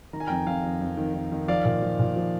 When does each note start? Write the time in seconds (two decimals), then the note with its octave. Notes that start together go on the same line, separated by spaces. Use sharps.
0.13 D#3 A#5
0.20 G#5
0.27 F2 G5 A#5
0.47 F2 F5 G#5
0.64 F2
0.81 F2
0.97 D#3
1.14 D#3
1.32 D#3
1.48 F3 D5 F5
1.65 A#2
1.82 F3
1.99 A#2
2.16 F3